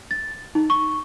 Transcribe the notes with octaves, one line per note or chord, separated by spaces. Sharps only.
A6
D#4
C#6